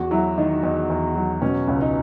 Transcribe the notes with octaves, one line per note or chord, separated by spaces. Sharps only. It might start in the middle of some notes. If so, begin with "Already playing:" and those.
Already playing: E2 F#4
F#3 E4
D#3 D#4
E2 D#4
E2
F#3
B2 C#4
C#2
D#4